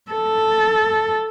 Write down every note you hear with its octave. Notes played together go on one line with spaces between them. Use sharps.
A4